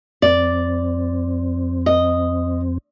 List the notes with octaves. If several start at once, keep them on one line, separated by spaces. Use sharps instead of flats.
F2 C4 D5
D#5